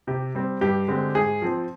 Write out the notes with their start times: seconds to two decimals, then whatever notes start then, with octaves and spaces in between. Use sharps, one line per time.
0.07 C3 G4
0.35 G3 C4
0.61 G2 G4
0.88 D3 G#3 C4
1.15 G#2 G#4
1.42 F3 C4